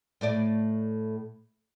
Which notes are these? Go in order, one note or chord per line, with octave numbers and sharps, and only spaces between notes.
A2 A3 D5